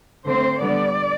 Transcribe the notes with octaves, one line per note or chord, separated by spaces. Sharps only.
D3 A3 C4 C5
D3 G3 B3 D5